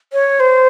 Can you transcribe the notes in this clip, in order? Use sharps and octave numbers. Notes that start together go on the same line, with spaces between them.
C#5
C5